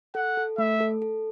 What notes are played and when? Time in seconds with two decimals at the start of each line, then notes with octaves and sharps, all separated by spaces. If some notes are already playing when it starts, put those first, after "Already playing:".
0.15 A4 F#5
0.37 A4
0.58 A3 E5
0.80 A4
1.02 A4